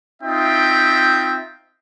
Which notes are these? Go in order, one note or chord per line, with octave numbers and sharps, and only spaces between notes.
C4 D#4 F4 E5 G5